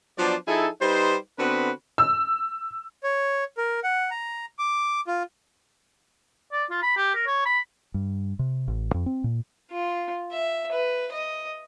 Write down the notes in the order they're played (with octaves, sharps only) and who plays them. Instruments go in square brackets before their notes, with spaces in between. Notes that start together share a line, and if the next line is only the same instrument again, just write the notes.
[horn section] F3 F#3 B3 D4 C5 D5
F3 D#4 E4 G#4 A4
G3 D#4 B4 C5
D3 B3 C4 F#4 B4
[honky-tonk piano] E6
[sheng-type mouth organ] C#5
A#4
F#5
A#5
D6
F4
[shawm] D5
F4
B5
G4
A#4
C#5
B5
[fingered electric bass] G2
C3
A1
F2
C4
A#2
[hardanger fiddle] F4
E5
B4
D#5